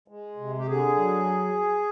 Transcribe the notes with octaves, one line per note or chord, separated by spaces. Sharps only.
G#3
C3
G4
D3 G#4
F#3